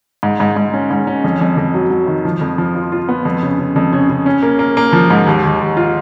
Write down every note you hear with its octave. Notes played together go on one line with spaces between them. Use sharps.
G#2
G#2
G#2
C#4
G#2
C#4
F2
F2
F2
F#3
F#3
D#3
F3
F2
F3
F4
F4
B3
F2
C#3
C#3
F2
C#3
C#3
C#4
A#3
A#3
A#3
F3
G#2
D#2
D#2
D#2
F4